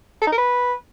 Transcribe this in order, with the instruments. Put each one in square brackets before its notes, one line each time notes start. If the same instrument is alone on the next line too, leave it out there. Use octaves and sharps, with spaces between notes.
[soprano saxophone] A4
D#4
A#4
B4